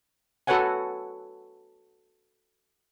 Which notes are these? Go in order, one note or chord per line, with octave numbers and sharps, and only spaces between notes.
F#4 A4 B4 C#5 F#5 G#5